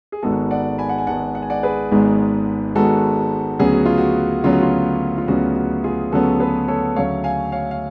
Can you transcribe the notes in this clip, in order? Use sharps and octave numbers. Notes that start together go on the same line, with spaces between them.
G#4
G#1 G#2 G#3 B3 F#4 A4
D5 F#5
G#5 B5
F#5
G#5
G#1 G#2 G#3 B3 F#5 A5
F#5
G#5
D5 F#5
G#4 B4
G#1 G#2 G#3 B3
G#1 G#2 G#3 B3 F#4 A4
D2 C#3 F#3 B3 G#4
F#4
F4
F#4
D2 C#3 F#3 B3 F4
F#4
F4
F4
D2 C#3 F#3 B3 F#4
F#4
F4 G#4
D2 C#3 F#3 B3 F#4 A4
G#4 B4
A4 C#5
D2 C#3 F#3 A3 C#5 F5
F5 G#5
C#5 F5
F5